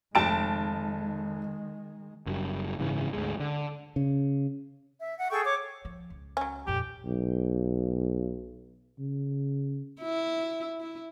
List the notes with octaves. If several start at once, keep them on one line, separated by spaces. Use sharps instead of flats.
F1 D#3 G#3 A5 D7
F#1 F#2 G3
F#1 G#2 C#3 E3
D2 G#2 G#3
D3
C#3
E5
F#5
G#4 A4 G5 C#6
C#5 D6
F3
C#2
F#3 C#4
F2 A#2 G4
B1
C#3
E4
E4